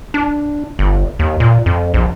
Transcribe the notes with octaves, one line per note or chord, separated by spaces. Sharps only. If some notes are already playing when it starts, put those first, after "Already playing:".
D4
G1
D#2
A#2
F2
A#1